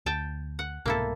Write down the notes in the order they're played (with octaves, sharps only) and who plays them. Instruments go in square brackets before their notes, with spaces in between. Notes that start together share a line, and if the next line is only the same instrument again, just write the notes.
[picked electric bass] D2 [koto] G5 A5
[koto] F#5
[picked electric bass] C2 G#2 B2 [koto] A#3 E4 A4